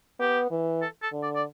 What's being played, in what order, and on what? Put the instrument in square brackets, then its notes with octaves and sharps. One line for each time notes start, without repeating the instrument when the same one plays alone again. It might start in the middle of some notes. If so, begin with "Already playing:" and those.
[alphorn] B3 [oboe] G4
[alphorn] E3
[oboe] A4
A4
[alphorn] D3
[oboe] D5
D5